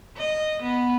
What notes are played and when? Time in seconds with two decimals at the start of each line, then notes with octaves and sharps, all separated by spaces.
0.17 D#5
0.62 B3